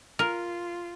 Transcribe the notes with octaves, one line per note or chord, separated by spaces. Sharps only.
F4 A#4